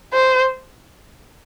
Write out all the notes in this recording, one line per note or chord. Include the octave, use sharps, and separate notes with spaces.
C5